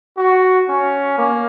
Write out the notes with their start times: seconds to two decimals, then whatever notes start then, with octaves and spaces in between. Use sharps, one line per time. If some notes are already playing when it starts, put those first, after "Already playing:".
0.17 F#4
0.69 C#4
1.18 A#3